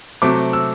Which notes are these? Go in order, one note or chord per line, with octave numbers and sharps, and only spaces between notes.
C3 F#3 A3 C4 D6
E6